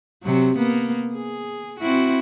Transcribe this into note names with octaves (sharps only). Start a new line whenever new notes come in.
C3 F#3
A#3 B3
G#4
C4 E4 F#4